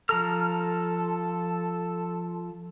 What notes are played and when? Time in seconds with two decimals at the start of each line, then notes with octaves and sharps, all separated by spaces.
0.09 F3 A4 A#5 F6